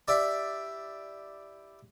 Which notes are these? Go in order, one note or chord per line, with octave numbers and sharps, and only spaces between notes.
E4 G4 D5